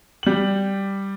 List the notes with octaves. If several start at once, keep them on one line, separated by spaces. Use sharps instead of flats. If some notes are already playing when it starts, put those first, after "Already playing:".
G3 F#7